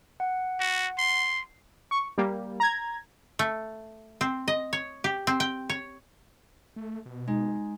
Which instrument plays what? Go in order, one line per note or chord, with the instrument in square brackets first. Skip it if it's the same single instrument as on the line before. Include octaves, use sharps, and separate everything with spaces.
[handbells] F#5
[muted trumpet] F#4
C6
[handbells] C7
[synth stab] C#6
G3 A#3
A#5 G#6
[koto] A3
C4
D#5
C#5
G4
C4
G5
C#5
[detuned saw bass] A3
B2
[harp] G#3 [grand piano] D#4